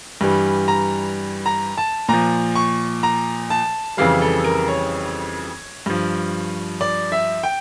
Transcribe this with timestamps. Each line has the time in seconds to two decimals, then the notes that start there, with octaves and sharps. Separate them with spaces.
0.21 G2 E3 G3
0.68 A#5
1.46 A#5
1.78 A5
2.09 A#2 F3 A#5
2.55 C#6
3.03 A#5
3.50 A5
3.97 F2 C#3 E3 G3 F5
4.21 A4
4.44 A#4
4.68 C#5
5.86 G2 F3
6.81 D5
7.12 E5
7.43 G5